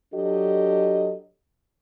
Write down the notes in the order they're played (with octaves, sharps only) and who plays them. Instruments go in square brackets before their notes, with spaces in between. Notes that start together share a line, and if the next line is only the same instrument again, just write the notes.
[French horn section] F#3 D4 G4 A4 D#5